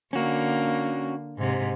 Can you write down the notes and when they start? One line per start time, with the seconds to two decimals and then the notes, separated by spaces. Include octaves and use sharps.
0.13 D3 A#3 C#4 F#4
1.38 G#2 C3